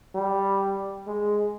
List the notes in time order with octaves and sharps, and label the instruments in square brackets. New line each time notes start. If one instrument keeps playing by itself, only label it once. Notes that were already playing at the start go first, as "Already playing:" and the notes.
[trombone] G3
G#3